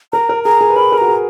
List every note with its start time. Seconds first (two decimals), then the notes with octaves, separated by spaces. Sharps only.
0.13 A#4 A#5
0.29 A#4
0.44 G#4 A#5
0.61 G#4
0.70 B4
0.76 A#4 B5
0.92 A#4
0.98 F#4 A#5
1.08 G#4